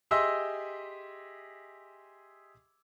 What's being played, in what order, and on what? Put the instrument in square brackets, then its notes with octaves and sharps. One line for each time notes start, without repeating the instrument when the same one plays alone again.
[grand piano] G4 G#4 D#5 E5 C6 E6